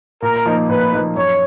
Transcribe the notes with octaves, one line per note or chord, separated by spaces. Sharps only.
A#2 A#4
F3 A#3 D#4
A#2 B4
F3 A#3 D#4
F#2 C#5